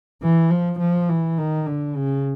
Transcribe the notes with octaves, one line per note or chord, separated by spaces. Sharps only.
E3
F3
F3
E3
D#3
D3
C#3